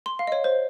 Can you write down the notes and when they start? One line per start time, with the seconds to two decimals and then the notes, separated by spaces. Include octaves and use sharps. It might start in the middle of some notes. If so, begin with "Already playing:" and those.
0.06 C6
0.19 F5
0.27 D#5
0.32 C#5
0.44 C5